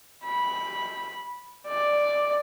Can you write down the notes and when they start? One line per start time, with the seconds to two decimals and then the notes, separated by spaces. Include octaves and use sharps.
0.25 B5
1.68 D5